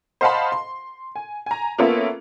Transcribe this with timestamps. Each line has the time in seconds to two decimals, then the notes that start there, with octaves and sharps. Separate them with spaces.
0.21 C5 D#5 F5 F#5 A5 B5
0.52 C6
1.16 G#5
1.46 G#5 A#5
1.78 A#3 B3 C#4 F4 A4 E5